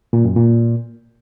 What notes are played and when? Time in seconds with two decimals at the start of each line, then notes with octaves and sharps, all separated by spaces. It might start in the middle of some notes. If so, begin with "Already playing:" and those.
0.13 A#2
0.24 F#2
0.36 A#2